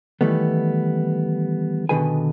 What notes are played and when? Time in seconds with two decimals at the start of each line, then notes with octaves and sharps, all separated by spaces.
0.21 D#3 E3 G3 A3 B3
1.89 B2 D3 D#3 G#4 B4 G#5